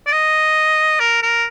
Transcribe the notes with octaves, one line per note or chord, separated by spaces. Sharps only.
D5
D#5
A#4
A#4